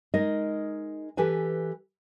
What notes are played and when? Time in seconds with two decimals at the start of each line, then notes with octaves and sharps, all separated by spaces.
0.14 G#3 D#4 A#4 D#5
1.17 E3 G4 A4 B4 G#5